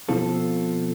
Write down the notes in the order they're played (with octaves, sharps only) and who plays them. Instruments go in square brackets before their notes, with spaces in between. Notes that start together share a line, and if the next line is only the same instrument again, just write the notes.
[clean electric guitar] B2 F3 C4 F4 A4